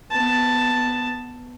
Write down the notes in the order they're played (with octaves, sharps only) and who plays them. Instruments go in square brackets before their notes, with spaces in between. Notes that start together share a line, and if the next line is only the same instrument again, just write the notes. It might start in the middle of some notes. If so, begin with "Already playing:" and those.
[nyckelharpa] B3 A5